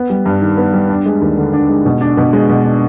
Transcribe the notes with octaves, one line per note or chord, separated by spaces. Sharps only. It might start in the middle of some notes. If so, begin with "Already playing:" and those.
Already playing: B3
G3
G2
D#3
B3
G3
D4
G#3
D#2
D3
D4
G#3
B2
D4
B2
G#3
B2
D4